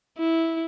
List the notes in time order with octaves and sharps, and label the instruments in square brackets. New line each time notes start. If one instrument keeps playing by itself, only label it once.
[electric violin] E4